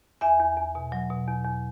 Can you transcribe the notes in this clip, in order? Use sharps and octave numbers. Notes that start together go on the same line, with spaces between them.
E2 E5 G#5
E2
E2
B2
F#3
B2
E2
E2